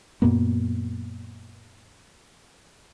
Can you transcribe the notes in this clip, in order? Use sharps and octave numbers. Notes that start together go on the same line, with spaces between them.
F#2 A#2 A#3 B3